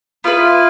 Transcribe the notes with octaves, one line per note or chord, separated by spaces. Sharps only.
B3 E4 F4 B4